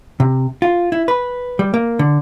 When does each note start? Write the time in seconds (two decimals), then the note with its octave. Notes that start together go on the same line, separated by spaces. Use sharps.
0.20 C3
0.62 F4
0.92 E4
1.08 B4
1.59 G3
1.74 A#3
1.99 D3